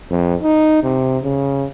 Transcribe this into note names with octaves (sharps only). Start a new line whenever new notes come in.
F2
D#4
C3
C#3